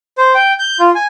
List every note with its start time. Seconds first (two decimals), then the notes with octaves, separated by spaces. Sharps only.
0.18 C5
0.35 G5
0.59 G6
0.80 F4
0.95 G#5